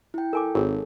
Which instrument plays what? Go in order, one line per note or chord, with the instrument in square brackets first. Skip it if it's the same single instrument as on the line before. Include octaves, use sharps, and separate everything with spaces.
[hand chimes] E4 G5
[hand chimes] A4 [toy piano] A#4 G#5 D6
[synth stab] G#1 [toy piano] G#4 A#4 C#5